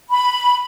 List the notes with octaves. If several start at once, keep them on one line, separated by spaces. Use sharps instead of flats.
B5